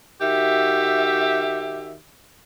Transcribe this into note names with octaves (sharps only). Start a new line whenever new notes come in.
D#3 F#4 G4 E5